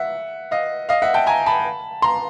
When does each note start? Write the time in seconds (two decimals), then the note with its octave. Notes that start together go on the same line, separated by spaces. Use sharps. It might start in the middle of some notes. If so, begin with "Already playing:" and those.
Already playing: E5 F#5
0.51 D#5 F5
0.89 D#5 F5
1.02 E5 F#5
1.14 G5 A5
1.27 G#5 A#5
1.46 A5 B5
2.02 A#5 C6